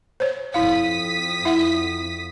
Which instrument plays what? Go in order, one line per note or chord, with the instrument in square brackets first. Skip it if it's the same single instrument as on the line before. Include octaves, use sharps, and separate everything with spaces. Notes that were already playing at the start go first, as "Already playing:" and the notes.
[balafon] C5 C#5
[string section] F2 D#6 B6 [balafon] E4 F5
[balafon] E4 E5 F#5